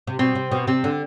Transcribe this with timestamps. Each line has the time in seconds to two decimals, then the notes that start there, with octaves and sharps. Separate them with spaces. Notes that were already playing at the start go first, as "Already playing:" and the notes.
0.07 C3
0.19 B2 C4
0.35 C3
0.51 B2
0.67 C3 C4
0.84 D3